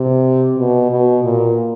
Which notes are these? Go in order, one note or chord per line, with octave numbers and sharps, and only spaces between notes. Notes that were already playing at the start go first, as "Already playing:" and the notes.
Already playing: C3
B2
B2
A#2